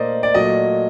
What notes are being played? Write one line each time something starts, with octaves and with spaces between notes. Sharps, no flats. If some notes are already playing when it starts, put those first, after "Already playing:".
Already playing: A#2 A3 A#4 C5 D5 D#5
D5
A#2 F#3 A3 D#5